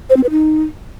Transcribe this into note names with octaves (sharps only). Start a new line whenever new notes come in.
C5
C4
B4
D#4